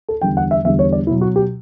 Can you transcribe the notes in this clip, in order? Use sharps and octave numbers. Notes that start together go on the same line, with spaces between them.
A4
E2 D3 G3 G5
F#5
E5
E2 D3 G3 E5
C#5
D5
B2 F#3 E4
F#4
G4